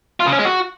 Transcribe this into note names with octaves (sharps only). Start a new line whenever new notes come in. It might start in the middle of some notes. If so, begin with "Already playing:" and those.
F4
C#3
C#4
G#3
F#4